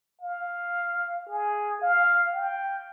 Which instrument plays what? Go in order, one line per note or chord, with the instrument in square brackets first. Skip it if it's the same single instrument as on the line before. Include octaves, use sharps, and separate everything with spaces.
[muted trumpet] F5
G#4
F5
G5